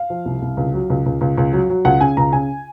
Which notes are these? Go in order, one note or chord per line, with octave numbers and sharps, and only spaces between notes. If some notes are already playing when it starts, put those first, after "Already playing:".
Already playing: F5
F3
C2
C2
C#2
F#3
C#2
C#2
C#2
C#2
F#3
F#3
C#2 F#5
C#3 G#5
C#2 A#5
C#3 G#5